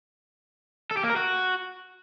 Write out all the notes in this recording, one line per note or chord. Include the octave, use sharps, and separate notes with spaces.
A4
G4
A#3
A#4
F#4